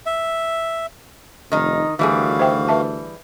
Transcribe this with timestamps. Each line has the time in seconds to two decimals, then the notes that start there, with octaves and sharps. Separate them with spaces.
0.06 E5
1.52 F1 D#3 D#4
1.99 D2 D#3 E3 G3 F#4 G#4 F5
2.39 C5 E5 G5
2.68 B4 E5 A5